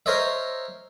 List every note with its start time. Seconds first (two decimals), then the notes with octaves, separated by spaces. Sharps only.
0.06 A#4 C5 C#5 D#5 E5